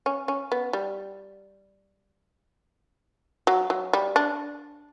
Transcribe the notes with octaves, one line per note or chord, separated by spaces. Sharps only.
C#4
C#4
B3
G3
F#3
F#3
G3
D4